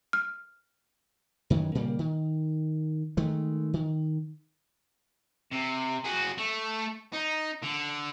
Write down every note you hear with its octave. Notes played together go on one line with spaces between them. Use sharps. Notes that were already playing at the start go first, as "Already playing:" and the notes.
F6
F#2 D#3 E3
A#2 C#3 G3 A#3
D#3
D#3 G#3 A3
D#3
C3
F#4 G#4
A3
D#4
D3